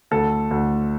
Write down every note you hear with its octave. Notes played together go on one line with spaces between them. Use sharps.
D2 A4
D2